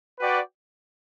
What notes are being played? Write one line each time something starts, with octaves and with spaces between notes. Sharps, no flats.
F#4 B4 D5 G5